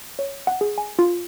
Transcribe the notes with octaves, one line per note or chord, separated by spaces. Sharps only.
C#5
F#5
G#4
G#5
F4